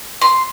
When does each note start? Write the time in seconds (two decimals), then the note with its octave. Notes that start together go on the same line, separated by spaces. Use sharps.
0.21 C6